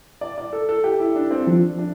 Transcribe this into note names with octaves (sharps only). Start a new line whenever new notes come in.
D5
D5
A4
A4
G4
E4
D4
C4
F3 D4
D4